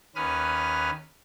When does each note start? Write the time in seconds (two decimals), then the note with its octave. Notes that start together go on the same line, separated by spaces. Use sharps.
0.15 D#2 C#4 B4 D#6 F6